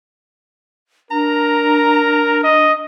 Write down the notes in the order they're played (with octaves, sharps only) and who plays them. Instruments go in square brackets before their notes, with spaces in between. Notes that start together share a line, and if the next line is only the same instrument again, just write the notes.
[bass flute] D4 [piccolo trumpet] A#4 [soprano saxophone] A#5
[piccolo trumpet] D#5